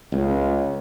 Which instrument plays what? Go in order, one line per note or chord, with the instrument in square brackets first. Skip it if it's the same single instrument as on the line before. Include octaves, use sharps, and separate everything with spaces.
[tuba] C#2